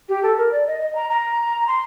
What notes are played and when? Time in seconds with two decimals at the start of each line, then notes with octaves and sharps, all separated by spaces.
0.09 G4
0.23 A4
0.37 A#4
0.51 D5
0.66 D#5
0.81 D#5
0.95 A#5
1.10 A#5
1.67 C6